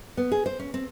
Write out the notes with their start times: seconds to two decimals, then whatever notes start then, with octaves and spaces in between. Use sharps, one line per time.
0.17 B3
0.32 G#4
0.46 C5
0.59 C#4
0.74 C4